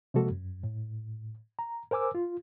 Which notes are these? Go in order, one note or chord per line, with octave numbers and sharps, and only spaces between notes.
C3 F3 G#3 A#3 F#4 A4
F#2
A2
A#5
A#4 C5 G#5 D6 E6
F4